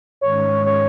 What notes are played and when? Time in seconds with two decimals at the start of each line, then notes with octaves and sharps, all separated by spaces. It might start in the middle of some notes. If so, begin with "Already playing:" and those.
0.21 G#2 D#3 G#3 C#4 C#5
0.65 C#5